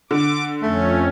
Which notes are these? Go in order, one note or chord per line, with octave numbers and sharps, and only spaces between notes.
D3 D6
F2 A3 C#4